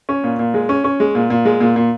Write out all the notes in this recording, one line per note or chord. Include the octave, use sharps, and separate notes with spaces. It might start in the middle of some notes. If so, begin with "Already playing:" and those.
C#4
A#2
A#2
G#3
C#4
C#4
G#3
A#2
A#2
G#3
A#2
A#2